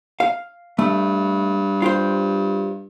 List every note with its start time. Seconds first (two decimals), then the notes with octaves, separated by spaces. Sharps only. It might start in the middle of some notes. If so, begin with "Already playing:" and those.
0.20 F5
0.79 G2 A3
1.82 F4 G4 C5